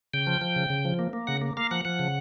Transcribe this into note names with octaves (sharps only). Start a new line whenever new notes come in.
C#3 G5
F3
F3
C#3
C#3
F3
A#3
A#3
C#3 F#5
A#3
A#3 F5
F3 F#5
F3 F#5
C#3